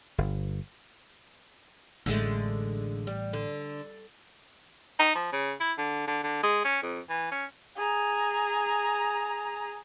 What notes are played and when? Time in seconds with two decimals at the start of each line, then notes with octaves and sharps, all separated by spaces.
0.18 G1
2.06 A1 D3 G#3 A3
3.07 G3
3.33 D3
4.99 D#4
5.15 F3
5.32 C#3
5.60 E4
5.78 D3
6.08 D3
6.23 D3
6.43 G#3
6.64 C#4
6.83 F2
7.10 E3
7.32 C#4
7.77 G#4 A#5